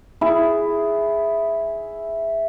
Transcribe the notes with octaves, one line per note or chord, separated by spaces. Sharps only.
E4 G#4